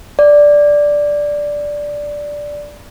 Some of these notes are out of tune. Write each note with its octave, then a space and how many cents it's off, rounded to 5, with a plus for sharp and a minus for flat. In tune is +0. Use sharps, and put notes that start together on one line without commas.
D5 -5